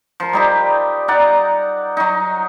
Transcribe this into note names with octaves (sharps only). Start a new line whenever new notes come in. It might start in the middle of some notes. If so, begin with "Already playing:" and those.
F3 A#4
G3 D#4 G4
D#4 D5 F#5 A#5
F#3 D#4